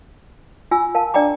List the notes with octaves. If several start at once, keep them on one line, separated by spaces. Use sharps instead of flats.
F4 G#5 E6
A#4 F5 A5
D4 D5 G5 A#5 D6